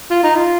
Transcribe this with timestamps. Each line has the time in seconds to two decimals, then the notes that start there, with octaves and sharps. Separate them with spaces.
0.11 F4
0.23 D#4
0.36 F4